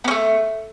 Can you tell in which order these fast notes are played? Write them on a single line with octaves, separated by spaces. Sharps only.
B3 C#4 A3